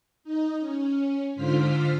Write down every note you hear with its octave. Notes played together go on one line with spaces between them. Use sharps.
D#4
C#4
G#2 D3 F4 C5 F6 B6